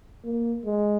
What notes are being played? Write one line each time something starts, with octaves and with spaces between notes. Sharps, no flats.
A#3
G#3